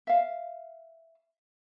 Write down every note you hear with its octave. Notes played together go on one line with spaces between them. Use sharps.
E5 F5